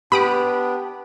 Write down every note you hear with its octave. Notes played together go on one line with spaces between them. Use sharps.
B3 D4 G4 B4 B5 D#6 D7